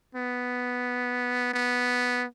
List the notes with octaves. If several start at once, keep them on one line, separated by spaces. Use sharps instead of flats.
B3
B3